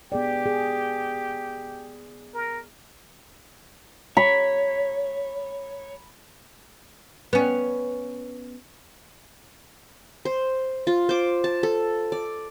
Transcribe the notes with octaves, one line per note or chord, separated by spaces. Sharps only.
B3 G4 G#4 D5
G#4
A#4
C#5 B5
B3 C#4
C5
F4
C5 D6
A5
A4
D5